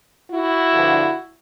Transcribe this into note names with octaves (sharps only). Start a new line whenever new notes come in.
E4 F#4
G2 D3 F3